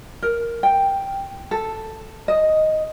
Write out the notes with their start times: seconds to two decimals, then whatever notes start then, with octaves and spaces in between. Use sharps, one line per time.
0.22 A#4
0.63 G5
1.51 A4
2.28 D#5